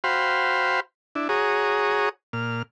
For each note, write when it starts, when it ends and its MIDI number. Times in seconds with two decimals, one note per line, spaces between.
0.04 0.80 66
0.04 0.80 72
0.04 0.80 77
0.04 0.80 79
0.04 0.80 83
0.04 0.80 84
1.15 1.28 62
1.15 1.28 64
1.29 2.09 66
1.29 2.09 68
1.29 2.09 73
1.29 2.09 82
1.29 2.09 87
2.33 2.62 46
2.33 2.62 89